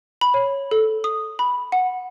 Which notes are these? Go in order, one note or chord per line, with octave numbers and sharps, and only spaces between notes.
B5
C#5
A4
D#6
B5
F#5